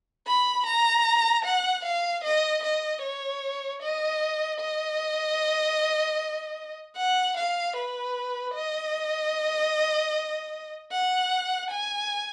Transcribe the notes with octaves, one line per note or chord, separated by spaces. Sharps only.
B5
A#5
F#5
F5
D#5
D#5
C#5
D#5
D#5
F#5
F5
B4
D#5
F#5
G#5